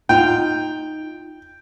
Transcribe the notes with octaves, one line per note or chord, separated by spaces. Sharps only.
D#4 F4 G5